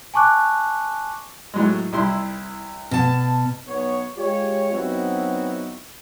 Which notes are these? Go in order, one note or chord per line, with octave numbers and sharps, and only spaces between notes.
G#5 A5 C#6 D6 F#6
A2 F#3 G#3
C2 E4 C6
B2 A5
B1 B3 C#5
G#3 F4 G4 C#5
F#3 B3 C4 D#4 E4 F#4